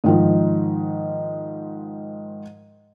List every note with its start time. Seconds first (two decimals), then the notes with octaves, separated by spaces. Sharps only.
0.04 G#2 D#3 F3